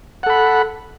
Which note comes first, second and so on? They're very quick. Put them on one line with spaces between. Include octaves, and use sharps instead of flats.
F#5 A4 B5